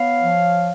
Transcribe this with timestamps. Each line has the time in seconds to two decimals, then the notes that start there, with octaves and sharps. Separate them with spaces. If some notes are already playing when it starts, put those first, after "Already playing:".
Already playing: B3 C#5 F5
0.20 F3